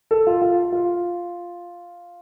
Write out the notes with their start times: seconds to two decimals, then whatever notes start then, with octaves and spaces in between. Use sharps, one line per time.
0.11 A4
0.27 F4
0.42 F4
0.72 F4